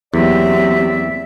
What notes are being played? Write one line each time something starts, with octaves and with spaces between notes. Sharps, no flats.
E2 F#3 A#3 C4 G4 D5 E5